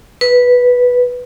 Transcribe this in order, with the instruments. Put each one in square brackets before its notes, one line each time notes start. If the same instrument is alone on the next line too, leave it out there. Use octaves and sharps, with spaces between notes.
[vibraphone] B4